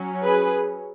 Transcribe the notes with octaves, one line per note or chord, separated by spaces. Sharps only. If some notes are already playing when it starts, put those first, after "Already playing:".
Already playing: F#3 C#4
G#4 B4